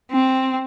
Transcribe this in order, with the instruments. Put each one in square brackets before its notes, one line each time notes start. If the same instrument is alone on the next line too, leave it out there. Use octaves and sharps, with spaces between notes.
[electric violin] C4